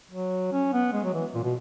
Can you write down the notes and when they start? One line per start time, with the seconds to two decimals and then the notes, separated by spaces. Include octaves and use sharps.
0.11 F#3
0.52 C#4
0.73 B3
0.93 G#3
1.04 F#3
1.14 E3
1.35 A#2
1.44 B2